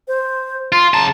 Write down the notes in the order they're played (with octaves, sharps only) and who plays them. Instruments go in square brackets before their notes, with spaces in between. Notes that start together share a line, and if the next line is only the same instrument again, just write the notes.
[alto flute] C5
[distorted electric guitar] F4 [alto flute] C6
[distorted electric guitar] C#3 A5 [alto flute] A#5